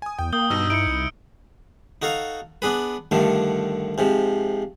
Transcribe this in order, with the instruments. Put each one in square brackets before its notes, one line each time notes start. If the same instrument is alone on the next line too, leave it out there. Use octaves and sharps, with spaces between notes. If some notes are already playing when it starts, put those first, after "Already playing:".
[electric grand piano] G#5 D#6
[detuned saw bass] E2 [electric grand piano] G5
[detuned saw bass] A#3 [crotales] D#6 G6 G7
[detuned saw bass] G2 [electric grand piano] B2 D#4 [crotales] E6
[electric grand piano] D#4 E4 [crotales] C#7 D7
[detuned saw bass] C2
[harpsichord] D#4 F#4 A4 F5
B3 D4 G#4 B4
G2 D3 D#3 F3 A3
G#2 C3 F3